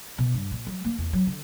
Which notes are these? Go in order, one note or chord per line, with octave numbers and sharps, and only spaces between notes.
B2
G2
A#2
F#3
A#3
E2
F#3
D3